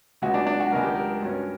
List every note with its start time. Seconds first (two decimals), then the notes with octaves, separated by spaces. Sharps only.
0.22 C#2 C#3 F#3 F#4
0.34 D4
0.47 D4
0.60 F#4
0.72 C#2 C#3 F#3 A#4
0.83 G4
0.96 A#4
1.22 G2 F#3 C#4